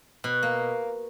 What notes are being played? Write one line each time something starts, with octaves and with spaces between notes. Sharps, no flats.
B2
A#3